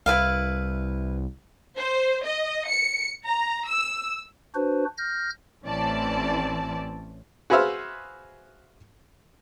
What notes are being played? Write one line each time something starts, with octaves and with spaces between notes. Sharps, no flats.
C2 E4 B4 F5
C5
D#5
C#7
A#5
E6
D4 F#4 B4 C5
F6 G6 A#6
A1 E3 C4 C#4 D5 A5
F#4 G#4 B4 C5 E5 F5